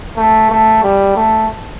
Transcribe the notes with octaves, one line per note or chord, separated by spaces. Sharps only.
A3
A3
G3
A3